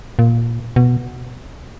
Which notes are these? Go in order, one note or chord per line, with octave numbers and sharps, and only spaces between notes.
A#2
B2